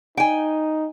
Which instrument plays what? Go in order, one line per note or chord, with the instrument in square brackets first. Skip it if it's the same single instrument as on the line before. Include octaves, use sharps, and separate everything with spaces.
[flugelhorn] D#4 [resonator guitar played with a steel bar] G5 G#5